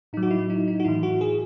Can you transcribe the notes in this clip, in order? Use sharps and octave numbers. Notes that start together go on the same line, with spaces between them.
A2 F#3 D#4
F#4
E4
D#4
D#4
F#4
A2 E3 E4
F#4
G#4